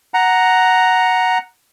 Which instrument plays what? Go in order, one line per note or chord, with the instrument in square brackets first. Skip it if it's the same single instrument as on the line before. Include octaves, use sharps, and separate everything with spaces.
[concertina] F#5 A#5